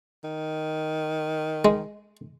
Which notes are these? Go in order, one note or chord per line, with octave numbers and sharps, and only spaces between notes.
D#3
G#3